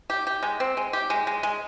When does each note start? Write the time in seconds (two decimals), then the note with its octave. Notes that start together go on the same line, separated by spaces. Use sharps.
0.10 G4
0.27 G4
0.43 G#3
0.60 C4
0.77 G#3
0.93 G4
1.10 G#3
1.27 G#3
1.43 G#3